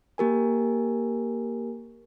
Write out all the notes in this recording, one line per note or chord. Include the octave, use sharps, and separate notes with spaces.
A#3 G4 A#4 G#5